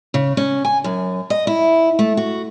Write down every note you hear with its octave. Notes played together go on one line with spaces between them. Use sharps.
C#3
C#4
G#5
F#2
D#5
E4
A3
F#4